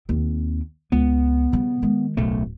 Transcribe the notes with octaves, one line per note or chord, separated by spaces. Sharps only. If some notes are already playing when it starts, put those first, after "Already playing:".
D#2 C4
C#2 B3
C#3 G3
D#3 G#3
D1 B1 A3